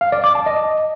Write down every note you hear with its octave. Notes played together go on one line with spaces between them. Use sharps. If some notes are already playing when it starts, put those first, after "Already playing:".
F5
D5
D6
A5
D#5